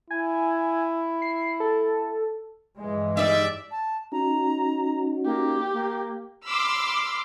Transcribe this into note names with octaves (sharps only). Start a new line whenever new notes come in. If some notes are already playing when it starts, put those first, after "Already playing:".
E4 G#5
C7
A4
G2 E3 G#3
G3 D#4 D5 E5
A5
C#4 D#4 F#4 A#5
A#3 G4
A#3
B5 C6 D6 E6 F6